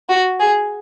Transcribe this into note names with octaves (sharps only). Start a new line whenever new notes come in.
F#4
G#4